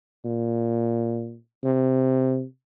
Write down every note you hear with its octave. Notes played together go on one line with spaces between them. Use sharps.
A#2
C3